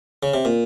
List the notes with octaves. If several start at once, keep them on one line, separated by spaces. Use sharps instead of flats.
C#3
C3
A#2